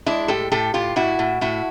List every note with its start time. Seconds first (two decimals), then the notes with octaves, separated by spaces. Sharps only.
0.06 G#3 D4 E4
0.28 A2 G4 A4
0.52 A2 G4 A4
0.74 A2 F4 G4
0.96 A2 E4 F#4
1.19 A2
1.41 A2 E4 F#4